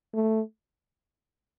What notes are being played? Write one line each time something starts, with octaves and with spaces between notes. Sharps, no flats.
A3